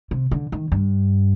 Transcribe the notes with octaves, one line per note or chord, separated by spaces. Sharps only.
C3
D3
D#3
G2